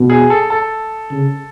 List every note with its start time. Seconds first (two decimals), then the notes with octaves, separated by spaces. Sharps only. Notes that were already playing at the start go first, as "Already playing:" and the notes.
Already playing: B2
0.10 G#4
0.30 A4
0.50 A4
1.12 C#3